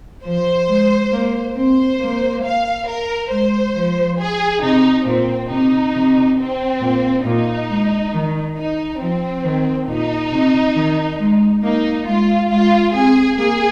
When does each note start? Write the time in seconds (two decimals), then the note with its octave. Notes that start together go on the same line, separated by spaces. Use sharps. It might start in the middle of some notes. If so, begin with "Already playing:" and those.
0.25 F3 C5
0.69 G#3
1.12 A#3
1.56 C4 C5
2.00 A#3
2.44 F5
2.88 A#4
3.31 G#3 C5
3.74 F3
4.18 G#4
4.62 C3 D#4
5.06 A#2 C4
5.50 C3 D#4
5.94 C3
6.38 C4
6.81 A#2
7.25 A#2 D#4
7.69 G#3
8.12 D#3
8.57 D#4
9.00 F3 C4
9.44 D#3
9.88 A#2 D#4
10.32 C3
10.75 D#3
11.20 G#3
11.62 A#3 D#4
12.07 G#3 F4
12.50 G#3 F4
12.93 C4 G#4
13.38 A#3 G#4